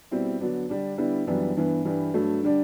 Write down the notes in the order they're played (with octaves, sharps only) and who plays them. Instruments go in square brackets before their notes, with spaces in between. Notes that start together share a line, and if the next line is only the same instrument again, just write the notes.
[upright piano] B2 G3 C4 E4
D3 F#3 B3 D4
D3 G3 D4
D3 G3 B3 E4
F#2 E3 G3 B3 D4
G2 E3 B3
G2 E3 G3
G2 F#3 A3
D3 G3 D4